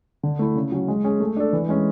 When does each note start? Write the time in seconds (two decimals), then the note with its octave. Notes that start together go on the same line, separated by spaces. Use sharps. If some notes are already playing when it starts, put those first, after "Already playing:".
0.23 D3
0.39 A3 E4
0.55 C#3
0.72 F#3 C#4
0.88 G#3
1.04 C#4 G#4
1.20 A3
1.36 D4 A4
1.53 E3
1.69 G#3 C#4